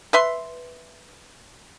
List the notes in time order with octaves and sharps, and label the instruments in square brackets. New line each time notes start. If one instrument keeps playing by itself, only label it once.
[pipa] B4 E5 C6